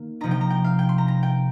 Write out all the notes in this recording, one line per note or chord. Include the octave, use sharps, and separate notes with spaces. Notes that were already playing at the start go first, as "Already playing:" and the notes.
Already playing: D#3 A#3
C3 F3 D#4 A#5
G5
A#5
G5
F5
G5
C6
A#5
A#5
G5